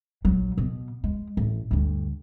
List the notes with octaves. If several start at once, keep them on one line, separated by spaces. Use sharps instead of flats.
A#1 F#3
B2
G#3
A1
D2 G2